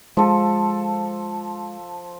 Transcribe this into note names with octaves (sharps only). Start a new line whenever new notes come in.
F3 G#3 A4